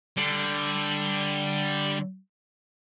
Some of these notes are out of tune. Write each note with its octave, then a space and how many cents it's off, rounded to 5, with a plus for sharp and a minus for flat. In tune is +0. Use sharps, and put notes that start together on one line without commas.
D3 +0 G3 +0